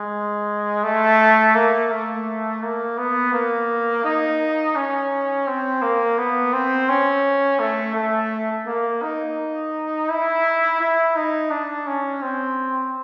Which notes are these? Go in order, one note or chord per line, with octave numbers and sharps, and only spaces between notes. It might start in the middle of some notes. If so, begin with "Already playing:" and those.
Already playing: G#3
A3
A#3
A3
A#3
B3
A#3
D#4
C#4
C4
A#3
B3
C4
C#4
A3
A3
A#3
D#4
E4
E4
D#4
D4
C#4
C4